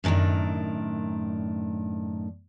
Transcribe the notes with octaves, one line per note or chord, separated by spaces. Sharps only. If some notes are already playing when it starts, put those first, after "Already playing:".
F#2 A2 D3 D#3 D4